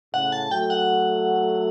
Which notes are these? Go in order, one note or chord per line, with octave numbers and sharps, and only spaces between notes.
A2 C#3 F#5
A5
F#3 A3 G5
F#5